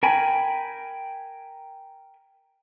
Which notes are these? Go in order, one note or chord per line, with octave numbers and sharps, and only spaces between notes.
A#4 G5 G#5 B5